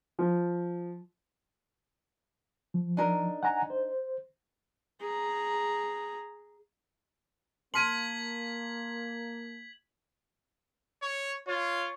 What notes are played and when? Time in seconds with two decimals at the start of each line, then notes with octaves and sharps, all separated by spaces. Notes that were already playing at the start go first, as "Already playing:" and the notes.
0.19 F3
2.74 F3
2.97 D4 D#4 A#4
3.43 F#5 G#5 A#5
3.70 C5
5.01 G#4 A#5
7.74 A#3 A5 C6 F6 G#6 B6 D#7 F#7
11.02 C#5
11.48 F4 C#5